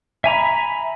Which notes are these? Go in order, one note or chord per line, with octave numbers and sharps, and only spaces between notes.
E5 G#5 A#5 B5